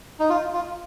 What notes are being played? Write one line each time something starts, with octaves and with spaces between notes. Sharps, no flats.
D#4
F4
F4